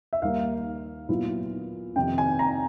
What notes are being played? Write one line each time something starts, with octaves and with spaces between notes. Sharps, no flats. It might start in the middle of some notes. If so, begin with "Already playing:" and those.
E5
D#2 D#3 G3 A#3 F5
A#2 F#3 B3 E4
F2 C3 D#3 G5
G#5
A#5